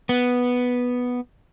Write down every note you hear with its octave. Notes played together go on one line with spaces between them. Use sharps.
B3